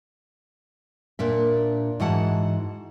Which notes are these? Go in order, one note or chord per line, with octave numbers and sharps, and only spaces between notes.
A#2 D4 E5
G#2 E3 F#4 F#5 A5